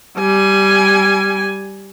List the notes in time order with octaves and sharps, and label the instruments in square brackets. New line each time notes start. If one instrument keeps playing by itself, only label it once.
[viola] G3 G#5